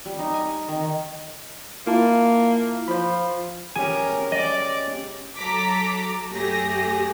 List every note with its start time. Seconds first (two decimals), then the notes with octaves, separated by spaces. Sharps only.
0.06 G3
0.19 D#4
0.34 G#5
0.68 D#3
1.87 A#3 E4 F4 A5
2.88 F3 C5 B5
3.76 C#4 G4 G#4 A#4 G#5
4.32 D5 D#5
5.36 F#3 A4 A#5 D6 B6
6.30 F#2 A3 G4 G#4 A#6